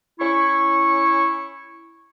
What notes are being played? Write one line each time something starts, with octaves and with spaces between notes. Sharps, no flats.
C#4 E4 C#6